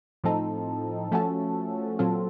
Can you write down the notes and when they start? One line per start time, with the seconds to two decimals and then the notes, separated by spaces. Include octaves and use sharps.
0.24 A2 F3 C4 D#4 A4
1.12 F3 A3 C#4 F#4 A4
1.99 A#2 F#3 C4 F4 A4